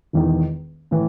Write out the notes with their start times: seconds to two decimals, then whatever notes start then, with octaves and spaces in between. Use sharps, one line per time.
0.13 E1 E2 D#3
0.91 A2 E3